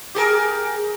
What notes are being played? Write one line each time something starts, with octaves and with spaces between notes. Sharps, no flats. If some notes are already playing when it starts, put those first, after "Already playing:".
G4 G#4 A#4